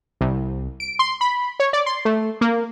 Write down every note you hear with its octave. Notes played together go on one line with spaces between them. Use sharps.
C2
D7
C6
B5
C#5
D5
C6
A3
A#3